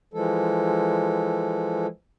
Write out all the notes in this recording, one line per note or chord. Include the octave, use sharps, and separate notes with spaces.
E3 F3 G#3 A4